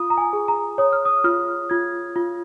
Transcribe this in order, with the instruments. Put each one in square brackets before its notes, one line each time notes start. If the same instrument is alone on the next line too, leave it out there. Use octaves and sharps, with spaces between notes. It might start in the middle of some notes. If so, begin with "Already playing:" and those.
Already playing: [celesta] F4 D#6
A#5
G#5
G#4
A#5
C#5 D#6
F6
D#6
F4 F6
F4 G#6
F4